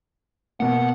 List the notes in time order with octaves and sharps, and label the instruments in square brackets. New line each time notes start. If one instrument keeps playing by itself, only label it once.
[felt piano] B2 A#3 [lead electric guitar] F#5